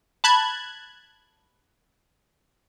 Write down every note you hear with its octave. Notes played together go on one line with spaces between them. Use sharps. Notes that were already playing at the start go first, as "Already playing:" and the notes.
A5 B5 F#6 G#6